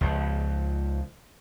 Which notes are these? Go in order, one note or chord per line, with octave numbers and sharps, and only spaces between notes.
C#2 F3